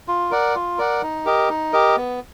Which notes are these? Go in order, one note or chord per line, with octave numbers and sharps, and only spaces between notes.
F4
A#4 D5 F#5
F4
A#4 D5 F#5
D#4
G4 A#4 D#5
D#4
G4 A#4 D#5
B3